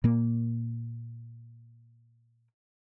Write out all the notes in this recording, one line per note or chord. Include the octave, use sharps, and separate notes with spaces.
A#2 A#3